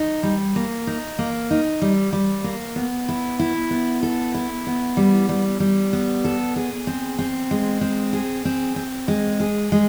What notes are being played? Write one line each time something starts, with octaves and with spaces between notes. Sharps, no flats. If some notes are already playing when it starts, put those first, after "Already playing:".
Already playing: D#4
G3
A#3
D#4
A#3
D#4
G3
G3
A#3
B3
E4
E4
B3
A4
E4
B3
G3
G3
G3
B3
A4
G#4
C4
C4
G#3
C4
G#4
C4
C4
G#3
G#4
G#3